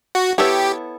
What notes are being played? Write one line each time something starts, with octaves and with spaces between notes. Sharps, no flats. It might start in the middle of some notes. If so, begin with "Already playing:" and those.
F#4
B3 E4 G4 A4 C#5